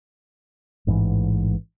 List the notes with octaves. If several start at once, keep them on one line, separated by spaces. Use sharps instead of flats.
A1 G#2 C#3 E3